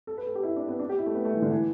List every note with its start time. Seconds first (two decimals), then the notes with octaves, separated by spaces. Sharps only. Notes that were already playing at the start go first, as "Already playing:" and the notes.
0.07 A4
0.18 B4
0.26 A4
0.35 G4
0.43 E4
0.56 D4
0.68 B3
0.79 D4
0.89 G4
0.98 E4
1.06 A3
1.15 B3
1.25 A3
1.34 E3
1.42 D3
1.51 E3